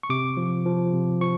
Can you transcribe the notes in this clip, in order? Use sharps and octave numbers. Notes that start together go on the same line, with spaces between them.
C#6
C3 D6
F3
F3
C3
F3 C#6